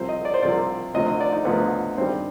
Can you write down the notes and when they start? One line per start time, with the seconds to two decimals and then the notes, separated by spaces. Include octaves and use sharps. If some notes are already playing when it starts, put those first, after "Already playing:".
Already playing: C2 C3 F3 C5
0.09 D#5
0.25 D5
0.34 C5
0.42 C2 C3 F3 D5
0.94 D2 C3 F3 D#5
1.07 D#5
1.20 D5
1.32 D#4
1.45 D2 C3 F3 B3
1.97 G2 D#3 G3 C4